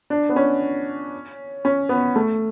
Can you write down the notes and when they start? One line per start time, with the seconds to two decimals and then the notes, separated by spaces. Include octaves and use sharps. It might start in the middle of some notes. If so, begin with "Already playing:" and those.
0.10 D4
0.29 B3
0.36 C#4
1.65 C#4
1.89 B3
2.16 A3